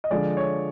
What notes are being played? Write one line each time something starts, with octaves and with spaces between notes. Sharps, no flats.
D#5
D3 F3 G#3 D5
C#5